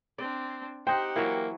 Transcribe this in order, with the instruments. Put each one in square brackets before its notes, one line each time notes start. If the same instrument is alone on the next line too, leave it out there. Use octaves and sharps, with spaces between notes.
[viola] C4 D4 [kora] D5
[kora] D#4 C5 [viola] G4 F#5 [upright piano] G5
[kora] E3 F#3 [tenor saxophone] A#3